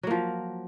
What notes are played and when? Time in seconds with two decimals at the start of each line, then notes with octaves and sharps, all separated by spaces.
0.03 F#3
0.07 A#3
0.11 F3